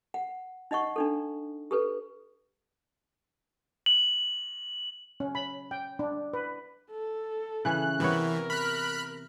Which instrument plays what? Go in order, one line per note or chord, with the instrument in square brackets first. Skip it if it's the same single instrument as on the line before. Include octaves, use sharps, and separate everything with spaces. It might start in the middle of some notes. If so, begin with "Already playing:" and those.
[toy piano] F#5
D#4 D#5 F#5 C#6
D4 D#4 A4
G4 A4 B4
[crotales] F#7
[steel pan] C#4
B5
G5
D4
B4
[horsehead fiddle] A4
[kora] C#3 E3 C#4 [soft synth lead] F#6
[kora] C3 B3 C#5 [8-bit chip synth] E3 [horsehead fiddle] A#4
[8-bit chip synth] B5 F#6 [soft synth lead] F6